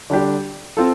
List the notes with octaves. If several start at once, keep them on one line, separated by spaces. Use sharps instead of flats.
D3 G3 D4 G4
C4 F4 A4